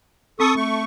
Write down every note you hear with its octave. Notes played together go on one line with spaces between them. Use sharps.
C4 A4 C#6 D#6
A3 C#6